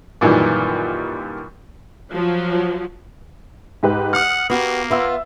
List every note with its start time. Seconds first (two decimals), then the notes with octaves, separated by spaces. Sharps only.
0.21 F#2 A#2 D#3 E3 G3
2.11 F3 F#3
3.83 G#2 G4 B4
4.13 F#5 D#6 F6
4.50 A#3 B3 F#4 G4
4.91 B3 F4 E5 E6